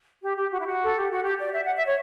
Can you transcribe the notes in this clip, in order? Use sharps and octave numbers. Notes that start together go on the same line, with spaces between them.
G4
G4
F#4
E4
F#4
A4
G4
F#4
G4
D5
E5
F#5
E5
C#5